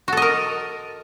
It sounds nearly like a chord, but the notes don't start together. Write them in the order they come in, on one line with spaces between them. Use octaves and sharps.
F#4 A4 D#5 A#4